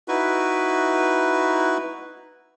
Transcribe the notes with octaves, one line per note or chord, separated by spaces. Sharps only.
D#4 E4 F#4 B4